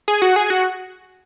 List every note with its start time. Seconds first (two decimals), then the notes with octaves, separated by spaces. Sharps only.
0.08 G#4
0.22 F#4
0.36 G#4
0.50 F#4